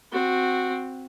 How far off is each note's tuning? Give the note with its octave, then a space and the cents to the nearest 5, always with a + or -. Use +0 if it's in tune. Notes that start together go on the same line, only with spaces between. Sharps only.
C4 +0 F#4 -10